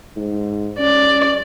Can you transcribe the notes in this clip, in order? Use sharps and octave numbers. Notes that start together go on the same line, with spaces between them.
G#2
C#4 D5